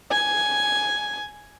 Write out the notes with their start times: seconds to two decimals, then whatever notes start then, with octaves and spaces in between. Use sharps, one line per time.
0.11 G#5